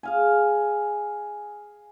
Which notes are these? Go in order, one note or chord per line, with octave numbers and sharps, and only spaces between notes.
G#4 F5 G#5